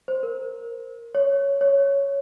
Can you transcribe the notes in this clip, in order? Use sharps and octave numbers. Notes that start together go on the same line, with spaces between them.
C5
A#4
C#5
C#5